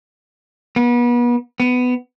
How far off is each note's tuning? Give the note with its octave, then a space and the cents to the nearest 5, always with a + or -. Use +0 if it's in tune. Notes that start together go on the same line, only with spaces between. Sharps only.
B3 -35
B3 +15